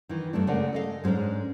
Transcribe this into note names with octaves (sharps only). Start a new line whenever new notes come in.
D#3 E3
G2 C3 A3 D4
C#3 G#3 A3 A#4 D5 F#5
A4 D#5 F5
G#2 G#3 B3 C#4 D4